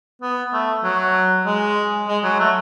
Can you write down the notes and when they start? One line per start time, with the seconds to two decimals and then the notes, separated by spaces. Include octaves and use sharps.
0.22 B3
0.53 A3
0.84 F#3
1.46 G#3
2.08 G#3
2.24 F#3
2.39 A3